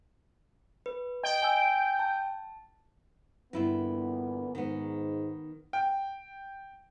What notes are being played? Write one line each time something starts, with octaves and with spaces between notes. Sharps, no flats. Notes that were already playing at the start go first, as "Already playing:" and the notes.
B4
D#5 G5
G#5 E6
A5
G2 A#2 D3 B3 E4 F4
G#2 D#3 B3
G5